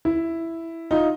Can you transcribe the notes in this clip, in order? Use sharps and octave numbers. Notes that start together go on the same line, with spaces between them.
E4
D#4 F4